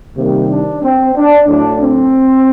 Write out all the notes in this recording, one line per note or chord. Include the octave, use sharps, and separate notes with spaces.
C3 D#3 G3 A#3
D4
C4
D4
A2 F#3 D4
C4